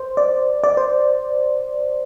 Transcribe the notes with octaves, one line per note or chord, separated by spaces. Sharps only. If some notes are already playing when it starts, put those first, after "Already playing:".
Already playing: C5
D5
D5
C5